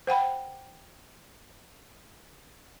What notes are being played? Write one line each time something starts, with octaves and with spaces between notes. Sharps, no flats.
C5 F#5 G5 B5